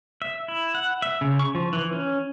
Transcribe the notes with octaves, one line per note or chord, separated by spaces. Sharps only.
E5
E4
F#5
E5
C#3
C#6
F3
E3
C#4